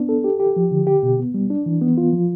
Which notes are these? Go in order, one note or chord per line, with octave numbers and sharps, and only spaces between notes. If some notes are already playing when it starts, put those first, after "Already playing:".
Already playing: B3 D4
A4
G4
G4
F3
D3
G4
B2
B3
G3
D4
E3
B3
F4
F3